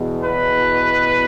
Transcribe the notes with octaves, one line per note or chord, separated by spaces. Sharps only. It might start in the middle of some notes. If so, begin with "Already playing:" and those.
Already playing: E2 B2
B4